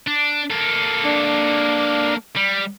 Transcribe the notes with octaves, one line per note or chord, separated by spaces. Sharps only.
D4
A#3 A4
D4
G3